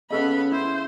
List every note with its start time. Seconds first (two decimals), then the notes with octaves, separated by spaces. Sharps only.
0.10 C#3 B3 C#4 A4 D#5 B5
0.52 E4 C5